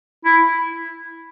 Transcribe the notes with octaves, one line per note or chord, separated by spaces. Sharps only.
E4